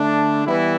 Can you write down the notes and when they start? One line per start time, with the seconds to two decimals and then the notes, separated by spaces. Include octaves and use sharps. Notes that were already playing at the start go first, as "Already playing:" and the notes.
Already playing: D3 A3 D4
0.46 E3 G3 B3 E4